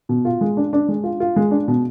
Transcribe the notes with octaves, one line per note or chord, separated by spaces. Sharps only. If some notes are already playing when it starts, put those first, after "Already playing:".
B2
F4
G#3
D4
D4
G#3
F4
F4
G#3
D4
B2